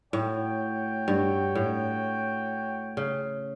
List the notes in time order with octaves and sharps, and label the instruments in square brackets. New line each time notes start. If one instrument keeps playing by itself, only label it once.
[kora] A2 [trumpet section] F#4 C#5 G5
[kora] G2
A2
C#3